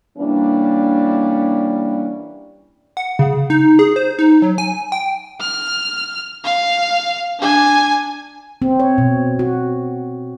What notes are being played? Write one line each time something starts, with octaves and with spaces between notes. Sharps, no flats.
E3 G3 A#3 C#4 D4
F#5
C#3
D#4
G#4
C5
D#4
F#3
G#5
G5
F6
F5
D4 G#5
C4
C#5
B2
F#4